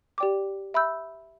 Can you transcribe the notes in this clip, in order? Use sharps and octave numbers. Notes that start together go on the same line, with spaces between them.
G4 D5 G5 D6
E5 B5 E6 G6